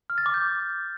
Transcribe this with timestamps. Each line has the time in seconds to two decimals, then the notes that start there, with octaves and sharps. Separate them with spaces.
0.10 F6
0.18 A6
0.26 D6
0.34 G6